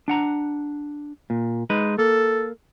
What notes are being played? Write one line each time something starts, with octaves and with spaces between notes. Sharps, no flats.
D4 F#5 A#5
A#2
G#3 D#4 B4
A#3 A4